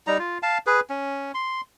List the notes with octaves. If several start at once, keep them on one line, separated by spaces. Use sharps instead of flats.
G3 D#4 A#5
F4
F5 A5
G#4 B4
C#4
C6